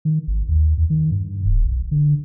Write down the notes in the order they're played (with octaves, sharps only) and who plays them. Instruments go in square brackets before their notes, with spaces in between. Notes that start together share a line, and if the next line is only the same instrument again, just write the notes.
[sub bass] D#3
G#1
D#2
E2
D#3
G2
D1
B1
D3